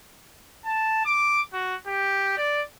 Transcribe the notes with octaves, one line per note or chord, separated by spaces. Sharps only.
A5
D6
F#4
G4
D5